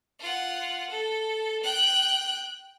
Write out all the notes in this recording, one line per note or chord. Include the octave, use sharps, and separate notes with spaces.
F4 F#5
A4
G5 F#6